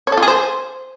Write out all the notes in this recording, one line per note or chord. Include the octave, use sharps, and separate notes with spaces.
C#5
A4
F4
G#4
C5